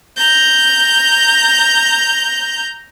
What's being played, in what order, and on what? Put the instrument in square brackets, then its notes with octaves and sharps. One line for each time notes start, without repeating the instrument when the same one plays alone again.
[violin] A#5 G6